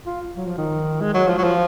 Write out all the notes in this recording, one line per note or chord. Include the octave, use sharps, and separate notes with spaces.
F4
F#3
F3
D#3
G#3
F#3
F3
F#3
F3